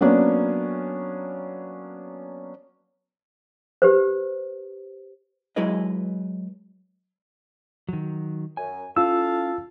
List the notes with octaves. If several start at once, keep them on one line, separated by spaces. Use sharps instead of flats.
F#3 A#3 B3 C#4 D4
G4 B4 C5
F#3 G#3 E4 G#4 B4 D#5
D#3 F#3
F#2 G#5
C#4 E4 F4 A4 F5 A5 E6